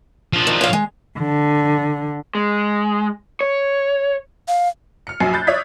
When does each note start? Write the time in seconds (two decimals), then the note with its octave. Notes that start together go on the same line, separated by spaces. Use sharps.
0.33 F3 D4
0.47 D#3
0.61 C#5 F5
0.73 G#3
1.18 D3
2.35 G#3
3.41 C#5
4.48 F5
5.07 F6 C#7
5.20 A#1 F#2 F#3 G#5 C7
5.33 B5 F#6 G6 A6
5.47 C#5 D5 E5 D#6 G#6 B6